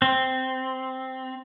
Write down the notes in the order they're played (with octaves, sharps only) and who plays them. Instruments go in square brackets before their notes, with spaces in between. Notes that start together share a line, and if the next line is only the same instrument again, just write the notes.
[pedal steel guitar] C4